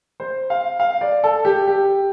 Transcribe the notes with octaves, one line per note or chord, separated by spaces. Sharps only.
C5
F5
F5
D5
A4
G4
G4